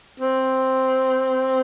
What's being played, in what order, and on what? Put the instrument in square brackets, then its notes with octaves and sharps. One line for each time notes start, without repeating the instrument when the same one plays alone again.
[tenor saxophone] C4